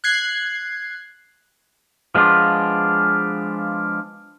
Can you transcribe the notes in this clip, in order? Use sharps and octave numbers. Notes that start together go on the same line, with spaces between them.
F#6 G#6 C7
F3 G#3 B3 D4 F4